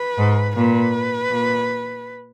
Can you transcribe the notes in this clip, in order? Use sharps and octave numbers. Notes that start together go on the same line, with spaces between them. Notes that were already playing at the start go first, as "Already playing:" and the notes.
Already playing: B4
G#2
A#2 B4
A#2